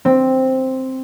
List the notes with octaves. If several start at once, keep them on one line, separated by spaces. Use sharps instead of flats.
C4